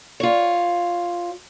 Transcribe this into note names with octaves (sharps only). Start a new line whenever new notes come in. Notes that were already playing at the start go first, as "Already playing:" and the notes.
F4 C#5